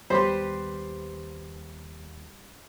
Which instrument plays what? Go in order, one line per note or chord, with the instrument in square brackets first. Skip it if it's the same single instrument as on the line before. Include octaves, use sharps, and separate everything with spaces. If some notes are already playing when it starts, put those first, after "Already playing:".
[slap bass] D#2 B3 [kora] G3 G4 B4 [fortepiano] C5